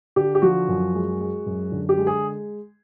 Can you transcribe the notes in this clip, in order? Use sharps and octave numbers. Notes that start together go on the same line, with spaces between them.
D3 G4
G4
F3 F#4
F#2
G#3
G#3
F#2
D3
G4
G#3
G#4